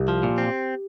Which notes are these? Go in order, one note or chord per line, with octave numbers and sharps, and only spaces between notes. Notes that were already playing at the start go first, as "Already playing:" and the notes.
Already playing: C2 G4
F3
A#2
C4